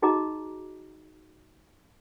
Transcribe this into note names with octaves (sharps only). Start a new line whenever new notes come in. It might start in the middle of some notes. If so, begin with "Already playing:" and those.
D#4 F#4 G#4 D#5 A#5 D6